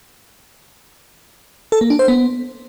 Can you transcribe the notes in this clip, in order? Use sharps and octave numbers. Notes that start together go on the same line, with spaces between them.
A4
A#3
D4
C5
B3